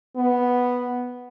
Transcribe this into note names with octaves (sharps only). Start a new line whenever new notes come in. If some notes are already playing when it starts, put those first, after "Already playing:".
B3